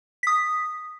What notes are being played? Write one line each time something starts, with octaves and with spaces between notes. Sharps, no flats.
D#6 B6